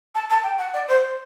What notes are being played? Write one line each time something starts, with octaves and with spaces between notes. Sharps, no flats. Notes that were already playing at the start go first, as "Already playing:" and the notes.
A5
A5
G5
F#5
D5
C5